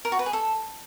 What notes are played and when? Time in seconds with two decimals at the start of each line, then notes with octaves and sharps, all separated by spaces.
0.05 A#4
0.12 F#4
0.19 B4
0.26 G#4
0.33 A4